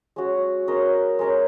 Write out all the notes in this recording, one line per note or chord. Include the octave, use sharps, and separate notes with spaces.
G#3 C#4 F#4
G#3 C#4 A#4 D#5
G#3 C#4 A#4 D#5